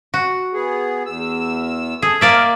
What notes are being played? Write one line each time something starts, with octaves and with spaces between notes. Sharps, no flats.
F#4
B3 G#4
E2 E6
G#4 A4
A#3 A#4 D5 E5